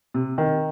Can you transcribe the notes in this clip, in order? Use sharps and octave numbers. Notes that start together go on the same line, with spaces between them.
C3
D#3